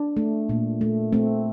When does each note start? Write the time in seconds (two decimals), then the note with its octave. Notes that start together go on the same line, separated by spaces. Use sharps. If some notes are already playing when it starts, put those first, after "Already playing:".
Already playing: D4
0.17 A3
0.49 A#2
0.81 A3
1.13 A3 C4